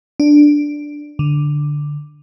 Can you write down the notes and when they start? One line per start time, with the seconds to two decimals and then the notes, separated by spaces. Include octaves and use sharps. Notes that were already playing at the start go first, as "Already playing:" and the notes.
0.20 D4
1.19 D3